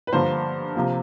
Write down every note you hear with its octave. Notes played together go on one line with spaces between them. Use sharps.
B4
G2 D3 F3 A#3 C5
C3 F3 A#3